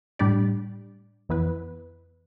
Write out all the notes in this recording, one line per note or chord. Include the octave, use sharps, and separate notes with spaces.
A2 G3 D4 G4 D5
F2 E3 B3 E4 B4